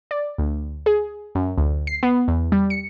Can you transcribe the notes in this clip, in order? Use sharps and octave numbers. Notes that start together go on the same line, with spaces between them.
D5
D2
G#4
F#2
D2
C7
B3
E2
G3
C#7